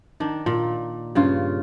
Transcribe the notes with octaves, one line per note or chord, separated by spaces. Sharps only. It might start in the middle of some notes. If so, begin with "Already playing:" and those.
D#3 D4
A#2
G2 C#3 F4